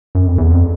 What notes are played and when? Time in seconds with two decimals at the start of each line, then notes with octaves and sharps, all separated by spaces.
0.15 F#2
0.26 F2
0.38 E2
0.50 F2